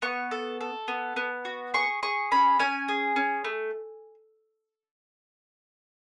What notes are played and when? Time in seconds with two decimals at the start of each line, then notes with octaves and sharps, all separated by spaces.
0.02 B3 C#6
0.31 A4
0.61 A4
0.88 B3
1.16 B3
1.45 F#4
1.74 G#4 C#6
2.03 G#4 C#6
2.31 C#4 B5
2.59 C#4 G#5
2.88 G#4
3.16 C#4
3.44 A3